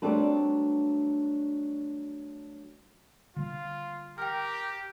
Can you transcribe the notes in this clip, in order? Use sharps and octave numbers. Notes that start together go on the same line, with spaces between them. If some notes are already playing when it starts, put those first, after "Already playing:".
F#3 G3 A3 C4 D4 B4
D3 G3 A#3 F4
G4 A#4 G5 F6